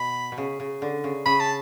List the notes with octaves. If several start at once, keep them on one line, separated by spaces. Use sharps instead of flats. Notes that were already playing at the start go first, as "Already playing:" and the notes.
Already playing: B2 B5
B2
C#3
C#3
D3
C#3
C#3 B5
A5